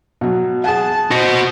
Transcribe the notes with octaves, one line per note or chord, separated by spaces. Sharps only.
B2 F#3
G#4 F#5 A5
F#4 C5 D#5 A#6